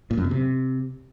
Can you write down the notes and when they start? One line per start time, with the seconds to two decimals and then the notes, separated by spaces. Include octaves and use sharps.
0.11 A#2
0.17 F#2
0.24 B2
0.31 C3